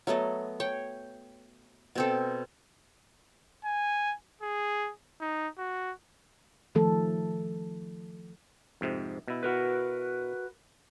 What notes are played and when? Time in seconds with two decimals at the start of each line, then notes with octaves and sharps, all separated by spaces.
0.07 F#3 A3 B3 D#5
0.60 C#5 G5
1.95 B2 C4 A4
3.64 G#5
4.41 G#4
5.21 D#4
5.58 F#4
6.75 D#3 F3 A3 A4
8.81 F2 G#2 C3
9.28 B2 E4
9.43 F#4 A#4 B4